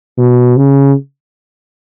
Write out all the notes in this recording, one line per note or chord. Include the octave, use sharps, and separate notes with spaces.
B2
C#3